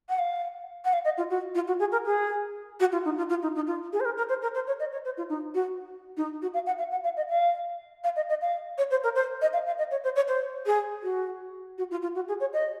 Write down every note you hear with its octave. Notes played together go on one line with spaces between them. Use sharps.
F#5
F5
F#5
F5
D#5
F4
F#4
F4
F#4
G#4
A#4
G#4
F#4
F4
D#4
F4
F4
D#4
D#4
F4
G#4
C5
A#4
A#4
C5
A#4
C5
C#5
D#5
C#5
C5
F4
D#4
F#4
D#4
F#4
F5
F#5
F5
F#5
F5
D#5
F5
F5
D#5
D#5
F5
C#5
C5
A#4
C5
D#5
F5
F5
D#5
C#5
C5
C#5
C5
G#4
F#4
F#4
F4
F4
F#4
G#4
C#5
D#5